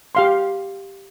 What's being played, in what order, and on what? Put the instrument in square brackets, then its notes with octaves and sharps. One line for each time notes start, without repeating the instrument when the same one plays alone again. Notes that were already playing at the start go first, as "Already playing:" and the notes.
[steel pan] G4 F5 C6